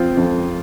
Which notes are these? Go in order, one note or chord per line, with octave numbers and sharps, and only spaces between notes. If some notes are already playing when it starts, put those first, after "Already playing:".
Already playing: F2 F3 C4 F4
F2